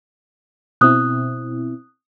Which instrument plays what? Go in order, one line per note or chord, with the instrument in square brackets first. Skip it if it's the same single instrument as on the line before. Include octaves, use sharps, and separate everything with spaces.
[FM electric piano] B2 C4 E4 [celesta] D#6 F#6